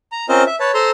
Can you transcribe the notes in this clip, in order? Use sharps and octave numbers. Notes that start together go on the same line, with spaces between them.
A#5
C4 C#4 F4 A#4 C5 D#5
E5
B4 C#5 A5
A4 C5 A#5 C6